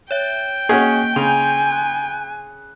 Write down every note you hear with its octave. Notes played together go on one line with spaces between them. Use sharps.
C#5 E5 G5
A#3 C#4 F#4 G#4
C#3 G#5 C6 G6
F#6